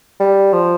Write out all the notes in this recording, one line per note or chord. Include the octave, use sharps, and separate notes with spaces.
G3
F3